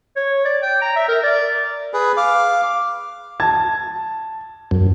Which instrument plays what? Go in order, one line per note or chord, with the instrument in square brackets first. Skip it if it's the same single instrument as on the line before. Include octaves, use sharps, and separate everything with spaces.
[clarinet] C#5
D5
G5
A#5
E5
A#4
D5
[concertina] G#4 B4
F5 D6
[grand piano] A5 G#6
[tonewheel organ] F#2